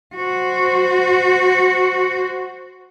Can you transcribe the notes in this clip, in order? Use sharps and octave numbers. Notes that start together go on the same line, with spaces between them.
F#4 C5